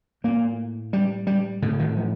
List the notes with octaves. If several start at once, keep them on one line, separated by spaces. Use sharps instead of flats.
A2 A#3
G3
G3
A2 D3
D#3
F3